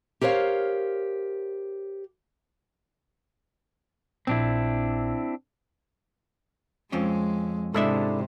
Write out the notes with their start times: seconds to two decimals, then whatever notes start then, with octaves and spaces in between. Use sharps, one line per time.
0.21 G4 A#4 C5 C#5 F5
4.27 A#1 C4 D4 E4
6.92 F2 G#3 C4 C#4
7.74 G#2 C3 G#3 D4 E4 A4 E5